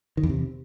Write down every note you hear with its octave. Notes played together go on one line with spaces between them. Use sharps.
D#3
E2
C3